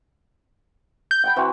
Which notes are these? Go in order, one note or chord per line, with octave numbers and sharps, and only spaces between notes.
G6
F#5 G5 B5
E3 C4 F#4